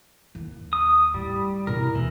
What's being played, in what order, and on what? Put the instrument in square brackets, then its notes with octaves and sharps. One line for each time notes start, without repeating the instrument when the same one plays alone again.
[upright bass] D#2
[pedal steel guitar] D#6
[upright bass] A2 [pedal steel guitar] G3
[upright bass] B2 E4 [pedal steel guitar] A#4
[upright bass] E2 [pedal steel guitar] E3